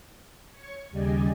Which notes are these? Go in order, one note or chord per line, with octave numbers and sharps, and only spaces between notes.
C#5 C#6
D#2 C#3 G3 D5 D#5 G#5